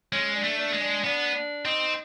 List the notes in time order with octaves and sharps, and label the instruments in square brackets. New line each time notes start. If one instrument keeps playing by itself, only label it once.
[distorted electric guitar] G#3 [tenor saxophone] C#4
[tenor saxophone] D4
[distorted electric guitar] A3
[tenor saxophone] D4
[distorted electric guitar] G#3
[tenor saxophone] D4
[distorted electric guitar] B3 [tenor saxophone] D4
[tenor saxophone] D4
[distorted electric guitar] C4 [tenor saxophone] D#4